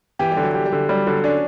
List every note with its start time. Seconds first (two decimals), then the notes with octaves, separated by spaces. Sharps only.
0.19 E3 G4
0.32 G3
0.37 D3
0.43 F#3
0.54 G4
0.66 G3
0.72 D3
0.89 F#3 G3
1.07 D3 F#3
1.24 C#4 D4